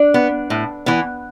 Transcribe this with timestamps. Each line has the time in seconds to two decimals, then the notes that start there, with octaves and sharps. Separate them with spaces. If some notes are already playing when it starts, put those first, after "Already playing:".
Already playing: D4
0.14 B3
0.50 A2
0.86 E3 B3